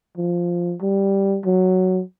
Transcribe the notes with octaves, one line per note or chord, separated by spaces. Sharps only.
F3
G3
F#3